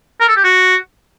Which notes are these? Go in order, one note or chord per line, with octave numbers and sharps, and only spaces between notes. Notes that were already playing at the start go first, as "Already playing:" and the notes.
A#4
A4
G4
F#4